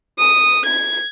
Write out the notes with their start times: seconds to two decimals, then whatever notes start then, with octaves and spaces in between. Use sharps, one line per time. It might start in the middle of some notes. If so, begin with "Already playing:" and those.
0.18 D#6
0.66 G#6